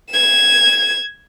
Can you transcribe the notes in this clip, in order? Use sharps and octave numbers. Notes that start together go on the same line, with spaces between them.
G#6 E7